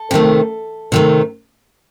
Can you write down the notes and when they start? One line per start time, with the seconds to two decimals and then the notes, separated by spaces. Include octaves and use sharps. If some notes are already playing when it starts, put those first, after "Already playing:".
Already playing: A4
0.11 C3 D#3 A3
0.92 C3 D#3 A3